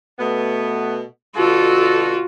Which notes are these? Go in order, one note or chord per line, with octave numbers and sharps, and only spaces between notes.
B2 A3 B3
B2 D3 F4 F#4 A4